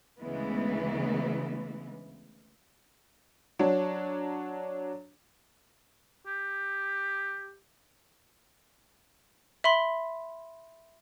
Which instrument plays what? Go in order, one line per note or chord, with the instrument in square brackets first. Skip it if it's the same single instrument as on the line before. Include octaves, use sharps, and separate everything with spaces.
[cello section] D2 C#3 E3 G#3 B3
[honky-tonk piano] F#3 D4 C#5
[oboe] G4
[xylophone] E5 B5 C6